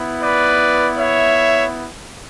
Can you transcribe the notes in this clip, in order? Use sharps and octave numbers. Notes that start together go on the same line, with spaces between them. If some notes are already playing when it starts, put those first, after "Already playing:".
Already playing: B3 E4
B4 D5
C#5 E5